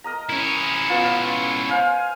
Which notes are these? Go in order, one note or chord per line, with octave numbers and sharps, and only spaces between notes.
A#4 D#5 A#5
C#4 E4
B3 F4
C5 F5 G#5